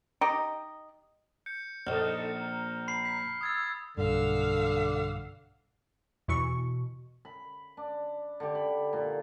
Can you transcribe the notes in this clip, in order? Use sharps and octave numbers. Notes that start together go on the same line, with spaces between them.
D#4 G4 D#5
G6 C#7
A#1 D#4 A4 D#5 F6
A#5
B5 C7
B6
D#6 E6 G#6 A6
B1 G2 D3 F5 F#5 E6
E2 B2 E3 C#6
B5
D4
D3 G4
B5
A#2